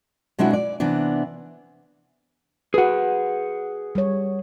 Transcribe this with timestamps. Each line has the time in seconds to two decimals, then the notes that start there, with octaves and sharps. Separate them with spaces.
0.39 B2 G#3 C4 D4 E4 F#4
0.53 D5
0.80 C3 E3 B3 D4
2.74 F#4 G#4 B4 F#5
3.95 G3 C#5